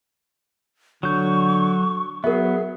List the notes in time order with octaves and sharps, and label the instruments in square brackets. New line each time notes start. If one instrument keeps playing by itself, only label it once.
[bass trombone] D3 [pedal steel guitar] F#3 G6 [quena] C#6
[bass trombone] F#3 [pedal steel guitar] B3 [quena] G#4 [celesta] A#4 E5